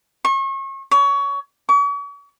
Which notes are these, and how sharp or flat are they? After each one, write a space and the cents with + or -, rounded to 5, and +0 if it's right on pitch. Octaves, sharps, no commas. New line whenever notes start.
C#6 -35
C#5 +25
C#6 +45